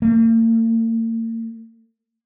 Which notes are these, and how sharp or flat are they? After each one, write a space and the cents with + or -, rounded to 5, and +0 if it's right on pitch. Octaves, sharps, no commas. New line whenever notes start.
A#3 -45